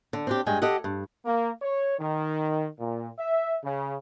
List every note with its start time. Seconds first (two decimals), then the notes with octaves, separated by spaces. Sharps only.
0.13 D3
0.27 C4 D4 G4
0.47 G2 G#3 G5 G#5
0.62 G4 A4 D#5 F#5
0.84 G2
1.25 A#3
1.62 C#5
1.99 D#3
2.78 A#2
3.19 E5
3.63 C#3